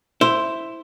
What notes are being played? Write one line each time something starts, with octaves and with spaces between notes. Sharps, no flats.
E4 C5